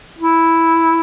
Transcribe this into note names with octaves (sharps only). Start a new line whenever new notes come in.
E4